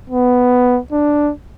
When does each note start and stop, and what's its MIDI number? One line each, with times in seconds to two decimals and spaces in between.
0.10 0.79 59
0.92 1.32 62